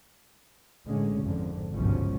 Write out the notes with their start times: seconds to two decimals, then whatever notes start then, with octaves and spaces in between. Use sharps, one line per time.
0.85 A1 D3 G#3 C#4
1.22 G#1 F2 D3
1.73 G1 C#2 G#2 B2 F3 C#4